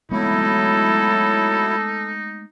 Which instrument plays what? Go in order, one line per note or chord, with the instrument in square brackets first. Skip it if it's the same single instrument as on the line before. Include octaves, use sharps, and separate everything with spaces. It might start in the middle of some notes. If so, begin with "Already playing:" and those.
[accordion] F#3 E4 [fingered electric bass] G#3 A3 B3 [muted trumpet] D#4 [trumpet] A4